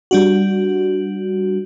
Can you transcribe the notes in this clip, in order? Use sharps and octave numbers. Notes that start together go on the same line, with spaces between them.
G3 D4 F#4